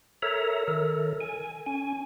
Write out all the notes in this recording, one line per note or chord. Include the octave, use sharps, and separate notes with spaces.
A4 A#4 C#5 E5 A#5
D#3 A4 A#4
G#5
C#4 G#5